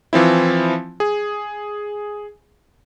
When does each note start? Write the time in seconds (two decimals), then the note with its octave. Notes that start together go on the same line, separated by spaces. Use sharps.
0.13 E3 F3 C4 E4
1.00 G#4